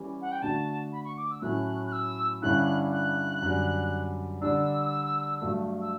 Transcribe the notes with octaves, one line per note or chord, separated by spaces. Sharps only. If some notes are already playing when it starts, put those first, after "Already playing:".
Already playing: E3 G3 C#4 G4
F#5
G5
D3 A3 D4 F#4 A5
B5
C#6
D6
E6
A2 F#3 A3 C#4 E4 F#6
F#6
E6
G2 D3 G3 C#4 E4 F#6
F#6
F#2 D3 G3
D3 G3 D4 E6
G2 F#3 A3
E6